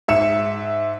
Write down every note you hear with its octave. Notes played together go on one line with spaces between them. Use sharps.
G#2 E5 C#7 E7